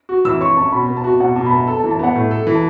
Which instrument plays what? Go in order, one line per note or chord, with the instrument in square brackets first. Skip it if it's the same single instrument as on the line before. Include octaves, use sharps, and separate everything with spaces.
[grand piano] F#4
[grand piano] E3 [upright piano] E6
[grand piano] C#5 [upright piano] C#6
[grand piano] C#4 [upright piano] A5
[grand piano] B2 [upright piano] B5
[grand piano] B3
[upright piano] A5
[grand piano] F#4
[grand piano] B2 [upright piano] F#5
[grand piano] B2 [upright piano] A5
[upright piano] B5
[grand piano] B3 [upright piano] A5
[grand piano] A4 [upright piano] A5
[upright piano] A5
[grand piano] E3
[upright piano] A5
[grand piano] B3 [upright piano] F#5
[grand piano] A2
A4
E3
[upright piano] A5